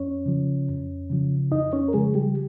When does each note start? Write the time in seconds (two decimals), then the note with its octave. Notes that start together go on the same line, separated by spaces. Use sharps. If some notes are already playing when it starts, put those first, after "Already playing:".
Already playing: F2 C#4 C#5
0.26 C#3 F3
0.68 F2
1.10 C#3 F3
1.52 F2 D#4 D#5
1.73 C#4 C#5
1.88 A#4
1.94 C#3 F3 G#3 G#4
2.15 G3 G4